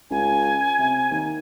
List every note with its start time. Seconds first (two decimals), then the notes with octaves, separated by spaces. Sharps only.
0.10 C#2 G#5
0.79 C3
1.11 D#2